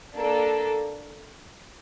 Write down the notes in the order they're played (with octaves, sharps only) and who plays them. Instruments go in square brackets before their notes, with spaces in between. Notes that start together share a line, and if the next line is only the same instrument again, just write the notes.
[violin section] A#3 D4 A4